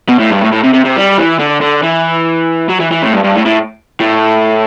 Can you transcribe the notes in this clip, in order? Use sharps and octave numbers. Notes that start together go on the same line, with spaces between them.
B2
A2
G2
A2
A2
C3
C3
C3
G3
E3
D3
D3
E3
F#3
E3
E3
A2
G2
G2
A2
A2
A2